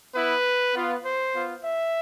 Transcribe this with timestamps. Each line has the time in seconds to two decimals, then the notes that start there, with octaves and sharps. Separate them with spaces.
0.14 B3 E4 B4
0.74 B3 F4
1.04 C5
1.34 B3 F4
1.64 E5